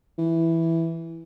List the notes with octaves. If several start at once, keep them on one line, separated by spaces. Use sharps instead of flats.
E3